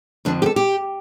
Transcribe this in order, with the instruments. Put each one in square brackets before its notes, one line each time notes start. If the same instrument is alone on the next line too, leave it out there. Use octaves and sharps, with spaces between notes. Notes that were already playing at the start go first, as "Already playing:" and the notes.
[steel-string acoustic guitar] F2 D3 F3 D4
G4
A4
G4